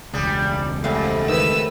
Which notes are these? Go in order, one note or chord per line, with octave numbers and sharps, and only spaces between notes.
E1 C#2 G3 D4 G#4
F2 G#2 G3 A3 F5
D#3 B4 E6